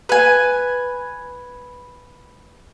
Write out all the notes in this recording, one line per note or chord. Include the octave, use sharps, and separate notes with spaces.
B4 G#5